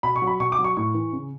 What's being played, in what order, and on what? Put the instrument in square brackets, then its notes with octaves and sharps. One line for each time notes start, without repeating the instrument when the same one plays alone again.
[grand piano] B2 B5
C#6
F#3
B5
B2 C#6
D6
F#3
C#6
A2 C#6
E3
C#3